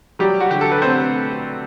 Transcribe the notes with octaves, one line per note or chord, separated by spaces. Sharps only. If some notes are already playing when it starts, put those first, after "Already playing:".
F#3 G3 G4
F#4
D3 G4
A4
B4
A3 C4 C5